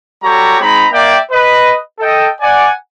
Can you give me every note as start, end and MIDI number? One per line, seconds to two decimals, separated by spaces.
0.23 0.56 55
0.23 0.56 66
0.23 0.56 67
0.23 0.56 69
0.23 0.56 73
0.23 0.56 82
0.60 0.86 56
0.60 0.86 60
0.60 0.86 63
0.60 0.86 82
0.60 0.86 83
0.92 1.18 58
0.92 1.18 74
0.92 1.18 76
0.92 1.18 79
1.31 1.75 71
1.31 1.75 75
1.99 2.29 69
1.99 2.29 75
1.99 2.29 79
2.41 2.70 74
2.41 2.70 78
2.41 2.70 80